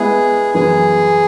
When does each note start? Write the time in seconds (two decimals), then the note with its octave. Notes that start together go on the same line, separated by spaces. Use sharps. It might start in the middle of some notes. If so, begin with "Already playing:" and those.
Already playing: G#3 B3 E4 G#4
0.54 F#2 E3 B3 G#4